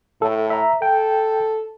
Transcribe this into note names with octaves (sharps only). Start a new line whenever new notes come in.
A2 A4
E5 A#5
A4 G5